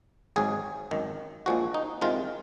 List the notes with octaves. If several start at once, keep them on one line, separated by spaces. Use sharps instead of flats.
G#1 G#2 F#3 G#4
G#1 F#2 D#3
A#1 A#2 F3 G#3 F#4
D#4
C2 C3 D#3 G#3 F4